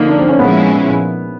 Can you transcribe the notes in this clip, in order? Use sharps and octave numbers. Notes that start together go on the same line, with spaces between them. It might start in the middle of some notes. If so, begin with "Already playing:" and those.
Already playing: D3 F3 A#3 D#4
D4
C4
C#4
A#2 F3 G#3 B3 C#4 E4